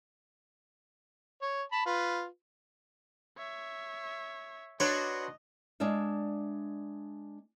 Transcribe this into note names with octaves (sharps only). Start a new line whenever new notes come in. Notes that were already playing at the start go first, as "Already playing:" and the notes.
C#5
A5 B5
F4 B4
C#5 E5
D4 F#4 B4 C#5 D#5 C6 F#6
G#3 D4 D5 E5 F5